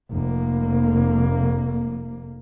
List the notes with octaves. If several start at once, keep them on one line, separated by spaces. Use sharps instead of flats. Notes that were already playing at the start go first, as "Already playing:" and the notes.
F1 A#3